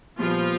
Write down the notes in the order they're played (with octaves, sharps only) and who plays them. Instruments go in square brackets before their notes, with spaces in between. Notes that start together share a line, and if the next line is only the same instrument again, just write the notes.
[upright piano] A#2 G3 B3 [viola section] F3 F4